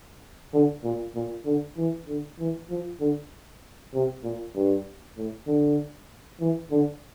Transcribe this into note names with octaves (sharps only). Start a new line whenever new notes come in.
D3
A#2
A#2
D3
E3
D3
E3
F3
D3
C3
A#2
G2
A2
D3
E3
D3